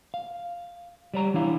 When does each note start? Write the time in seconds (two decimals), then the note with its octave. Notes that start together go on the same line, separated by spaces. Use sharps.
0.14 F5
1.14 G3 C#5 A#5
1.34 E3 D4 E4 F5